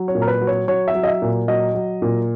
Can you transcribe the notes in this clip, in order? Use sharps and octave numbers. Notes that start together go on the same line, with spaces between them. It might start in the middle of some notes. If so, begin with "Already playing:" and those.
Already playing: F#3
C#5
A#2
A#4
B4
F#3
C#5
F#3 C#5
E5
F#3
D#5
E5
A#2
F#3 D#5
F#3
A#2